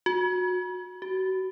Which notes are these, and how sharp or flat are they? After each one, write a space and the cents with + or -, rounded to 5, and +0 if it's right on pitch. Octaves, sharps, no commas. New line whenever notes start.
F#4 -25
F#4 +30